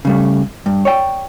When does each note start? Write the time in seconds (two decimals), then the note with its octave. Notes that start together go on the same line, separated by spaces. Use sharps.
0.05 C#3 G3 A3
0.66 G2
0.85 C#5 D5 G5